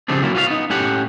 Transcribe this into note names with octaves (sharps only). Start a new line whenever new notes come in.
C#3 F3 G3 C4 D4
F#3 A#3 E4
F4 F#4 B4 D5 F5
B3 D#4
A2 C#4 G4 F#5